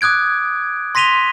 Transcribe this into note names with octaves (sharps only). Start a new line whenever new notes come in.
D6 D#6 F#6 G#6 D7
C6 A#6 B6 D#7 F7 G7